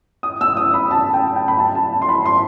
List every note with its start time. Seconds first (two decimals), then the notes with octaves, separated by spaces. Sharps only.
0.23 D#6
0.41 E6
0.57 D#6
0.74 B5
0.91 A5
1.13 G5
1.36 G5
1.48 B5
1.59 A5
1.75 A5
1.92 A5
2.02 C6
2.09 B5
2.26 C6